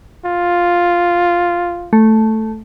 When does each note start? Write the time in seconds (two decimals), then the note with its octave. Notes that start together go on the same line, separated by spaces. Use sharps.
0.25 F4
1.93 A3